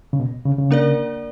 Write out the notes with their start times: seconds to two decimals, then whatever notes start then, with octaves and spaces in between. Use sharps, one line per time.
0.13 C#3
0.20 B2
0.46 C#3
0.58 C#3
0.71 A#3 D4 A#4 D5